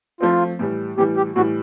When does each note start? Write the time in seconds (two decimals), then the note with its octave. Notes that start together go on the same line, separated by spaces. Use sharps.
0.21 F3 A3 C4 F4
0.59 A2 E3 G3
0.98 A2 E3 G3 G4
1.17 G4
1.36 A2 E3 G3 F#4